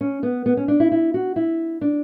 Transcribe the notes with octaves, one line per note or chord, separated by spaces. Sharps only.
C#4
B3
B3
C#4
D4
E4
E4
F#4
E4
D4